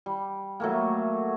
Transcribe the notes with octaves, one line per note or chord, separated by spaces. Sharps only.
G3
F#3 A3 A#3